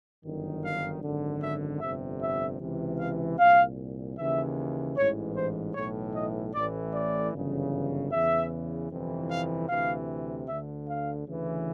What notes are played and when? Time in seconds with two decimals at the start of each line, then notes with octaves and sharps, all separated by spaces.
0.23 G1 F#2 D#3
0.64 F5
1.02 G#1 F#2 D3
1.41 E5
1.81 G1 F2 C3 E5
2.21 E5
2.60 C#2 C3 E3
3.00 F5
3.39 C2 A#2 F5
4.17 D#2 C#3 E3 E5
4.97 A1 G#2 E3 C#5
5.37 C5
5.75 B1 A2 E3 C#5
6.15 D#5
6.54 A1 A2 E3 D5
6.94 D5
7.33 G1 F#2 C#3 E3
8.12 E2 C#3 E3 E5
8.91 G1 F2 C3 E3
9.31 F5
9.69 D2 C3 E3 F5
10.48 D2 D3 E5
10.89 F5
11.27 D2 C#3 E3